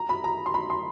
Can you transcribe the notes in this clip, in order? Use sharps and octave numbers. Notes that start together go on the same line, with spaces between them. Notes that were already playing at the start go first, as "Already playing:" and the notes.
Already playing: A#5
B5
A#5
C6
B5
C6